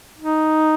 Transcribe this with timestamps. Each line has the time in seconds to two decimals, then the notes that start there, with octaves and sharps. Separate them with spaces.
0.18 D#4